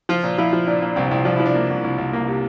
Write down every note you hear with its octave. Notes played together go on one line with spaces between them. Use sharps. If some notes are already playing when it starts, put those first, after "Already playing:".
F3 F4
A#2
F3 E4
F3
A#2 D4
A#2
C2 C4
C2 C4
F3 D4
F3 E4
D4
A#3
C2
C2
C2
A#3
C3